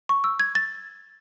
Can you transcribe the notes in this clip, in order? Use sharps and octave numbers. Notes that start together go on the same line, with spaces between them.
C#6
E6
G#6
A6